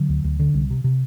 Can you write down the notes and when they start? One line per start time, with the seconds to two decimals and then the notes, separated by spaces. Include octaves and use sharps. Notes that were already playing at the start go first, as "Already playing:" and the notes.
Already playing: D3 F#3
0.09 D2
0.24 D2
0.39 D3
0.54 C2
0.70 C3
0.84 C3